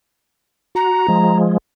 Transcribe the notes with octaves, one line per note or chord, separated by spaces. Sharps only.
F#4 A#5
F3 G#3